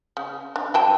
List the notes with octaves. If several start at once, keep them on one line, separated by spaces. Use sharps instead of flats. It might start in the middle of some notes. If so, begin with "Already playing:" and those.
C#3
D4
F#3 G5 A5